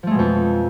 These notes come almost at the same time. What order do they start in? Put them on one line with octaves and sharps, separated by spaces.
F3 A3 G#3 B2 F2